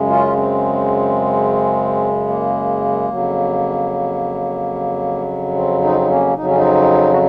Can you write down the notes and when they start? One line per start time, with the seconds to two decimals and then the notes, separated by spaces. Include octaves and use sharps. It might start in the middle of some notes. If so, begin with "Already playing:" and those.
Already playing: F#2 C#3 G#3
0.09 C#4 F4
0.36 C4
2.27 A#3
3.09 F2 C#3 F#3
5.55 C4
5.82 C4 D#4
6.01 D#4
6.09 A#3 C#4
6.36 F2 C#3 F#3 D#4
6.47 C#4
6.56 C4 D#4
7.12 F#4